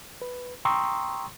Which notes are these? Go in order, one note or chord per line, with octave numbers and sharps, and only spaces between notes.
B4
G5 A#5 C6 C#6 D#6 E6